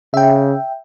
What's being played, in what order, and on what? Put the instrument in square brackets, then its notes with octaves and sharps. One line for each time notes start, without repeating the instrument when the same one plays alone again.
[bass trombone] C#3 [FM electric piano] E5 G5